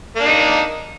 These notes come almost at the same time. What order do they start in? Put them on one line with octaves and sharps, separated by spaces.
A#3 D4 D#4